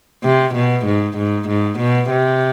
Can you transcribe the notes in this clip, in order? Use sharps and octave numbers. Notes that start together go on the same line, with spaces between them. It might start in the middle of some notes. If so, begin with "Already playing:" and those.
C3
B2
G#2
G#2
G#2
B2
C3